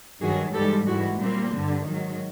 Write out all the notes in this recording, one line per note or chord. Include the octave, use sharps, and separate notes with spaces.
G2 D#3 F#3 F#4 G#4
G#2 E3 G3 G4 A4
G#2 E3 G3 E4 F#4
A#2 G3 A#3 C4
G2 D3 G3
G#2 D#3 F#3